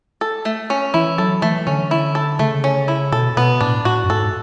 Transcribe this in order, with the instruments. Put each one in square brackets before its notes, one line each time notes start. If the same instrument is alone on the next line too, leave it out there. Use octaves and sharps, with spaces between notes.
[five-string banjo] A4
A3
C#4
[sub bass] E3 [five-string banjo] E4
[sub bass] F#3 [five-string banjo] A4
[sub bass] E3 [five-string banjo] A3
[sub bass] D3 [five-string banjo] C#4
[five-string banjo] E4
A4
[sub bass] C#3 [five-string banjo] A3
[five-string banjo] C#4
E4
[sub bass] B2 [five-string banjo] A4
[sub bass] B2 [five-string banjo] B3
[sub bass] A2 [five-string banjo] D4
[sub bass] A2 [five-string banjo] F#4
[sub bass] F#2
[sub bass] G#2 [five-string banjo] A4